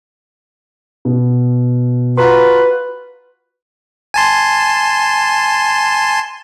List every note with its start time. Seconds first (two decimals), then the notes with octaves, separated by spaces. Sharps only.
1.05 B2
2.17 F4 F#4 B4 F#5 A#5 C6
4.14 G#5 A5 C6